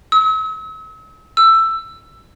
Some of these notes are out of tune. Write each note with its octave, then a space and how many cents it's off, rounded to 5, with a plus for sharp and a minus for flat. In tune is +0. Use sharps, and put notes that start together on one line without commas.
E6 -40
E6 +10